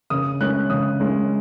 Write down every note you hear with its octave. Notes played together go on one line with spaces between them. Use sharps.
C#3 D#6
G#3 C#4 F#6
C#3 D#6
G#3 C#4